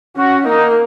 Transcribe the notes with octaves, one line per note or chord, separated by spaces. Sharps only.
C#4 F#4
A#3 D#4